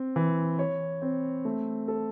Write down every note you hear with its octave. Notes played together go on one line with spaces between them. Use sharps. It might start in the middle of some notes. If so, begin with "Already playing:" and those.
Already playing: C4
E3
C#5
C4
A3
A4